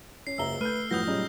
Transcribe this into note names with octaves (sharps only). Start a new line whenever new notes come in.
C#4 C7
F#1 C#2 E5 A#5 E6 G7
A3 B4 F6 G6 D#7
F#2 A2 F3 B3 D#6 G6 A#6
A#2 F#3 G3 C#4 D#4 G#4